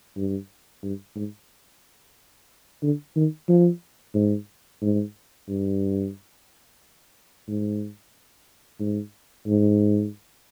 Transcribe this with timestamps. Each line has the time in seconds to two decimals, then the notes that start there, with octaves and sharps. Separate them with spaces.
0.17 G2
0.83 G2
1.16 G#2
2.83 D3
3.16 D#3
3.48 F3
4.15 G#2
4.81 G#2
5.49 G2
7.48 G#2
8.80 G#2
9.47 G#2